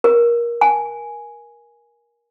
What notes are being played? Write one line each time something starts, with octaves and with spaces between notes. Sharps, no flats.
A#4
G#5